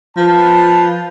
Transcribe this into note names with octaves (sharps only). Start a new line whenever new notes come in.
F3 B4 A5